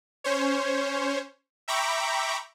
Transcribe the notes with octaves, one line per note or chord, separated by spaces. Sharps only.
C#4 C5 C#5
E5 G5 A#5 B5 C#6 D6